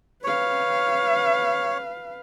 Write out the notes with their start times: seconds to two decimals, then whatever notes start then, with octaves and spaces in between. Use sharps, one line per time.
0.24 B4 C#5 F5